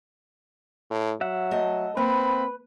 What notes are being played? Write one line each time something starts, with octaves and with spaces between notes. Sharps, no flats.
A2
F#3 E5 F#5
A3 D#5 A5
A#3 C4 B4 B5